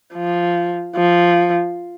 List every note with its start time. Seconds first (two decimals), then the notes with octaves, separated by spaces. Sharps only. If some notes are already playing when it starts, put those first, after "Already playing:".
0.14 F3
0.96 F3